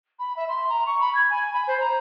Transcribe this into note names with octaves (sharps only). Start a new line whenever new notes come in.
B5
E5
C6
A#5
C#6
B5
G#6
G#5
B5
C5
A#5